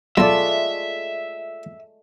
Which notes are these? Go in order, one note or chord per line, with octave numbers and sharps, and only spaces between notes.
B1 G#3 A3 F4 A4 D5 E5